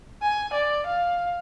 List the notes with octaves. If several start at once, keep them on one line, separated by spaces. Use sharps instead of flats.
G#5
D5
F5